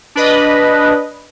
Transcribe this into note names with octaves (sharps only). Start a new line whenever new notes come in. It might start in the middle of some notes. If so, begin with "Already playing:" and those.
D4 B4 D#5